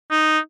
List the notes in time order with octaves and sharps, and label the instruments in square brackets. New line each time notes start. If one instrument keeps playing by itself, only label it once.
[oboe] D#4